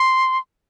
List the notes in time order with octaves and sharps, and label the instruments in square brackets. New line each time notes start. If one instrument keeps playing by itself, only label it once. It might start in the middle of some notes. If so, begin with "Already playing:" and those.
Already playing: [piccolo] C6